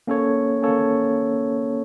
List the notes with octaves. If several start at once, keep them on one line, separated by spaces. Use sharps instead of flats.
A#3 C#4 A4 C#5
A#3 C#4 A4 C#5